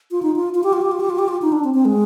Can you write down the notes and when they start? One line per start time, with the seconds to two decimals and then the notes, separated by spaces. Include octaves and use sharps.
0.11 F4
0.22 D#4
0.36 F4
0.55 F4
0.63 G4
0.73 F4
0.81 G4
0.91 F4
1.00 G4
1.10 F4
1.19 G4
1.28 F4
1.42 D#4
1.52 D4
1.64 C4
1.74 C4
1.85 G#3